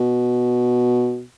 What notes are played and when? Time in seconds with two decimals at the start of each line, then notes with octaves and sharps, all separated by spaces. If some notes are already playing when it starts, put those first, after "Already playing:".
Already playing: B2